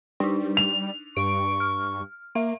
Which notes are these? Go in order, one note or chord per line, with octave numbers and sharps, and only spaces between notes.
G3 D4 D#4
F7
G2 C#6 D7
F6
A#3 E5